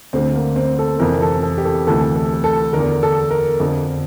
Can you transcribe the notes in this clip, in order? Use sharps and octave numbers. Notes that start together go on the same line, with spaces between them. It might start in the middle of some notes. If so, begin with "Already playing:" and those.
D2 D3 C4
A#3
C4
A4
F2 C3 E3 A#4
A4
A4
G4
A4
D2 C3 E3 A4
A4
A4
E2 D3 A#4
A4
A#4
F2 D3